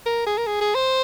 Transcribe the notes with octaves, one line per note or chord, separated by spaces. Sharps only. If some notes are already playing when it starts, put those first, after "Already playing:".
A#4
G#4
A#4
G#4
G#4
C5